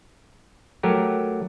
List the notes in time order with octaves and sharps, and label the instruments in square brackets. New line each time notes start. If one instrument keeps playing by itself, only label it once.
[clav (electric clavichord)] F#3 A3 G4 A#4